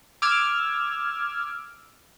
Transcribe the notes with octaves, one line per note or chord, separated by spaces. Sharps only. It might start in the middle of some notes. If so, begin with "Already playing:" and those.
D6 E6 F6 G#6